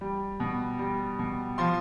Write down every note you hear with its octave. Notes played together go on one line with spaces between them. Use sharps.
G3
B2
G3
B2
F3 C6